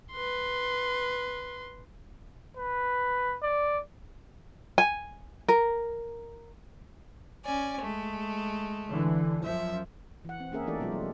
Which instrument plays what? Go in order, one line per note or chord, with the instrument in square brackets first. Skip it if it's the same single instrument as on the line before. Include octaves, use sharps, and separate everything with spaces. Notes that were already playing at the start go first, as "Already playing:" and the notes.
[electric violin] B4 C6
[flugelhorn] B4
D5
[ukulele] G#5
A#4
[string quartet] C#4 D5 G#5
G#3 A3
[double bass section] D3 E3
[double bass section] F#2 F3 [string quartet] E5
[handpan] E3 F#5
C4
A#3 C#4 G#4 A#4 E5
E3 A3 D#4 G4 A4 D5
B2 F#3 G#3 F4
G3